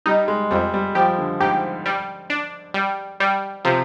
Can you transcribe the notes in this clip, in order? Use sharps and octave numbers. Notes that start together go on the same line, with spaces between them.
G3 D#4
G#3
F2 G3
G3
F3 G4
D3
G#2 G4
G3
D4
G3
G3
C3 F3